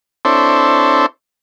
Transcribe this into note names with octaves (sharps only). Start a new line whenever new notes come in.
C4 D4 E4 A4 C5 C#5